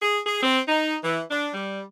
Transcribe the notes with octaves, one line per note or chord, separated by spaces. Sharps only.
G#4
G#4
C4
D#4
E3
D4
G3